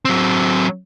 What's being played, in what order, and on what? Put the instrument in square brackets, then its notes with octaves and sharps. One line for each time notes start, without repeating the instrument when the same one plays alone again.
[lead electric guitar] F#3 C4